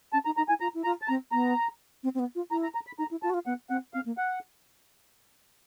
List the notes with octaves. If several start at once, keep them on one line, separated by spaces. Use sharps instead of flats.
C#4 A5
D#4 A#5
D#4 A#5
E4 G#5
F4 A#5
E4
F4 A#5
A5
C4 A#5
B3 A#5
C4
C4
B3
F4
E4 A#5
A#5
A#5
B5
D#4 A#5
E4
F4 A5
F#4
F4
B3 F#5
C4 F#5
C4 F5
A#3
F#5